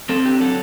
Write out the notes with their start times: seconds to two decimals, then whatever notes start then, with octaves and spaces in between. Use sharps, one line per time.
0.09 C4 A4
0.25 D3 G4
0.40 F#3 A4